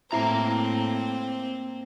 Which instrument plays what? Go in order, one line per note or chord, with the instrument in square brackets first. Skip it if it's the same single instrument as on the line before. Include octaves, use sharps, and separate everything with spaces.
[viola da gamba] A2 [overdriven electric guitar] A#3 A#5 [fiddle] C4 [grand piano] E4